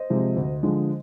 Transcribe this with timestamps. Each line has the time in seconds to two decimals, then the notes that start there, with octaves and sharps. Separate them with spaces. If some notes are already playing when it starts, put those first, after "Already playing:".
Already playing: C5 D#5
0.10 C3 F3 G#3
0.36 D2
0.63 D3 F3 G#3